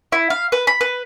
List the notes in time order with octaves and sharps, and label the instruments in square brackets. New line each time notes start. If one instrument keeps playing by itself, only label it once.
[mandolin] E4
F5
B4
B5
B4